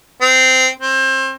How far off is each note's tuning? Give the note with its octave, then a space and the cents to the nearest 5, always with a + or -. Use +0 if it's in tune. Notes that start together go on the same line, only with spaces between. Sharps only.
C4 -15
C4 +30